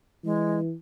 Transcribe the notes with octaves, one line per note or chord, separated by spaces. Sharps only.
E3 G#3